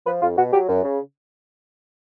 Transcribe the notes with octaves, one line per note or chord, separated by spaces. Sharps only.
F3 B4
F2 F4
B2 F#4
F#3 G4
F#2
C#3